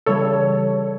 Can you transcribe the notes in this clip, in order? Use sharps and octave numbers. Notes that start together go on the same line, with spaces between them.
C#3 E3 G3 A4 C#5